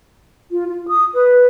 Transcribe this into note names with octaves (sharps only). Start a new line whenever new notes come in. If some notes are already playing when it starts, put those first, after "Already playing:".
F4
F4
D#6
B4